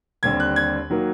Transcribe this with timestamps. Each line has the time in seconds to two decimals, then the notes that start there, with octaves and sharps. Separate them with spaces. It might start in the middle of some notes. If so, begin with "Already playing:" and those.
0.23 D#2 D3 G3 C4 G#6
0.40 F#6
0.56 G#6
0.90 D#3 F#3 A#3